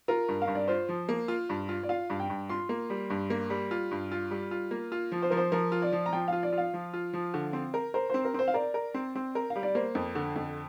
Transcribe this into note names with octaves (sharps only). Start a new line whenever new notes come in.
F4 A#4
G2
F5
G2
D5
F4 C5
F3
A#3
F4
G2
F4
D5
F4 F5
G2
G5
G2
F4 C6
A#3
G3
G2
A#3
G3
F4
G2
F4
G3
F4
A#3
F4
F3
C5
F3 A#4
C5
F3 A#4
F4
D5
F3
A#5
F3 G5
F4 F5
D5
F4
F5
F3
F4
F3
D3
C4
A#4
A#4 C5
C4 C5
A#4
C4 C5
F5
A#4 D5
A#4
C4
C4
A#4
F5
G3
D5
A#3 C5
F2
D3
F2